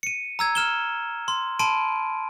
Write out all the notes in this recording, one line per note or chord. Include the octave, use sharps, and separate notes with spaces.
C#7 D#7
A#5 E6 G#6
F6 E7 G7
C6
A5 B5 C6 D7 D#7